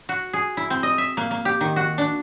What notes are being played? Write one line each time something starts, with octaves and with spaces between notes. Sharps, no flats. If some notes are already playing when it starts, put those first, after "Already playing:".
F#4
G#4
E4
C4
D#5
E5
A#3
A#3
G4
D#3
F#4
D4